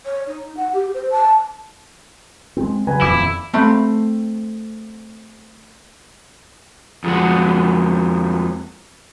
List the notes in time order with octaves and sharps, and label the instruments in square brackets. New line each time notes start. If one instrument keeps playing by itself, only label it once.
[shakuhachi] C#5
D#4
F#5
G4
C5
A5
[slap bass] G#3 C4
[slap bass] C#3 F#3 [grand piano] B4 G#5
[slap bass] D#1 F2 [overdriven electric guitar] E4 [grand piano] D6
[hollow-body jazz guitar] A3 C4 B5
[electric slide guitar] F2 G#3 F#4